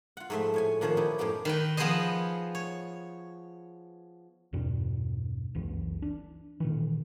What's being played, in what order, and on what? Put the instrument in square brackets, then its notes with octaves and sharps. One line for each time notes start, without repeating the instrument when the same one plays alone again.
[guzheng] F4 F#5
G#2 F3 A3 C5 E5 C6
A2 C#5 G#5
A#2 D#3 F3 C5 C#5 F#5
D#4 E4 G4 B4
F#2 A2 F3 B3 G4 G5
D#3 B4 G5
F3 B3 G#4 B4 C5 D#5
C#5
[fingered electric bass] E2 G2 B2 D4
F#1 C#2 E3
D4
A#2 D#3 E3